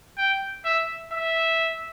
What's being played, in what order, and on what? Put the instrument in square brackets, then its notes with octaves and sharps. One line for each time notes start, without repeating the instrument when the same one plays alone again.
[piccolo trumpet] G5
E5
E5